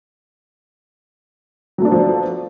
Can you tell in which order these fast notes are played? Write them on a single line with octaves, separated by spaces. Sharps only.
F#3 A3 D4 B3 F3